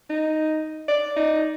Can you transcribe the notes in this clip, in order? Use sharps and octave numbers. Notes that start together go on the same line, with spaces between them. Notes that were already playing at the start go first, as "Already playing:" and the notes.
D#4
D5
D#4